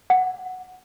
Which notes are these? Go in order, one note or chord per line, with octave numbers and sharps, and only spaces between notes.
F#5